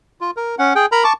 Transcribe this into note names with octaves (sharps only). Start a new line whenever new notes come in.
F4
A#4
C#4 F#5
G#4 G5
A#4 A#5 B5
A5 C#6 D6